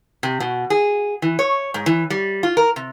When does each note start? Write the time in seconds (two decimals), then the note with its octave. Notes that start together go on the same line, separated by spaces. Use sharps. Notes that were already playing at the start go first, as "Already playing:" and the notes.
0.23 C3
0.40 B2
0.70 G#4
1.22 E3
1.39 C#5
1.74 G#2
1.86 E3
2.10 G3
2.43 F4
2.57 A#4
2.76 C3